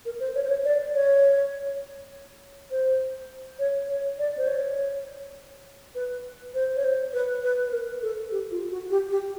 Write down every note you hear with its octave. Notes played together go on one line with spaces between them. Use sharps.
A#4
C5
C#5
C5
C#5
D5
C#5
C5
C#5
C#5
D5
C5
C#5
B4
C5
C#5
C5
B4
B4
B4
A#4
A4
G4
F4
F#4
G4
G4